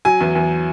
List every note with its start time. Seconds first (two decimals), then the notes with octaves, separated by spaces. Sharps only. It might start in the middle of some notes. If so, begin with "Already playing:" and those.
0.05 F#3 G#5
0.20 E2
0.35 E2